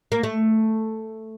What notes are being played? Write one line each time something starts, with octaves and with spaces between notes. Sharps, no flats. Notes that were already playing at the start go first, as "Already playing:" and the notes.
A#3
A3